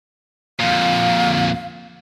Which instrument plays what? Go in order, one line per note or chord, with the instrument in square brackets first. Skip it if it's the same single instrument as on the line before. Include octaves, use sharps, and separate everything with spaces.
[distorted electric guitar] F2 A#2 [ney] F5